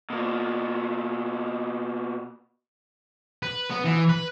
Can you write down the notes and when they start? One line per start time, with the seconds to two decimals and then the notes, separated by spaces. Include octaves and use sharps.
0.10 B2 A#3
3.42 B4
3.70 B3
3.85 E3
4.09 B4